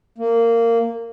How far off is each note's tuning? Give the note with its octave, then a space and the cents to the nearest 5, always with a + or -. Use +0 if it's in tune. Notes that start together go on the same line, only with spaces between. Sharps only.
A#3 -15